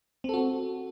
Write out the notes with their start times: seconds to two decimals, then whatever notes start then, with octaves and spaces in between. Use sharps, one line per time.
0.24 C4
0.29 A4
0.34 F#4